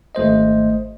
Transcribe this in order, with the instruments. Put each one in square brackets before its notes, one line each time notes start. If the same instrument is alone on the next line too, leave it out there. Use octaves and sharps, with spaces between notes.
[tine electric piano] G#1 A3 C5 D#5